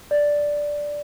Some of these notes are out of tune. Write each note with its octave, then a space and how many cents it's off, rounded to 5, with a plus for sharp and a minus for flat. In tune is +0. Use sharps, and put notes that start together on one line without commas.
D5 +0